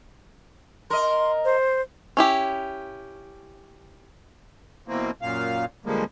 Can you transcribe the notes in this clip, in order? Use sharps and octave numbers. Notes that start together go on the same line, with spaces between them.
A#4 D#5 C6
C5
C#4 E4 G4
B2 E3 A#3 C4
F#2 A#2 F5
D3 F3 G3 G#3 A#3